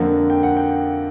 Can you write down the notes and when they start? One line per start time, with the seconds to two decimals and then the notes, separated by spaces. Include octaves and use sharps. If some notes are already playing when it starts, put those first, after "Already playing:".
Already playing: F2 D3 F3 A#3 F#5
0.30 G5
0.43 F#5
0.57 G5